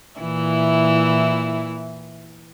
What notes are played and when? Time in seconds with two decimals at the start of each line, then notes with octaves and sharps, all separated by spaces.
0.20 A#2 E3 E4